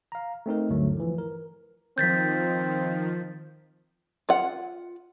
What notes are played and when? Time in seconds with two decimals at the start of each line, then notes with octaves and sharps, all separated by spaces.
0.12 F5 A#5
0.46 A3 C4 D#4 A#4
0.69 D2 G2 D3 F#3 A3
0.97 E3 F3
1.18 A#4
1.98 D#3 F3 C4 G6 A6 B6
4.29 F4 F#5